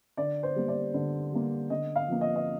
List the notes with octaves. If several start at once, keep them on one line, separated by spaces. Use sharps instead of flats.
D3 D5
C5
G3 A#3
D5
D3
G3 A#3
D3 D#5
F5
F3 A#3
D#5
D#5